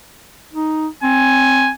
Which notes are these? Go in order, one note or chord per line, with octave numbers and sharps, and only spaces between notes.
D#4
C4 G#5